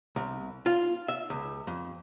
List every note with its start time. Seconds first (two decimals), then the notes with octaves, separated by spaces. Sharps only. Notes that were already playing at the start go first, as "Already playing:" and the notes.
0.16 C2
0.66 F4
1.08 E5
1.30 C#2
1.67 F2